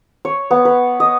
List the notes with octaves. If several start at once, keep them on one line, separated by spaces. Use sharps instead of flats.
C#5
B3
B4
D#5